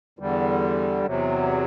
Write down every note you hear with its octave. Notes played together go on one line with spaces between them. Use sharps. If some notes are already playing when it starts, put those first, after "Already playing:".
E2 D3 G3
E2 C3 F#3